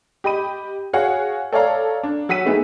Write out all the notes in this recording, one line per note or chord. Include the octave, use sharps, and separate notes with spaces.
G4 D#5 B5 D#7
F#4 G#4 C#5 F5 F#5
A4 C#5 D5 F5 A#5
D4
F#3 F#5 E6 B6 D#7
G#3 A3 B3 D#4 G#4